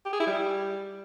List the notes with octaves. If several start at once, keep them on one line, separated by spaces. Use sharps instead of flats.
G4
G#4
E4
G3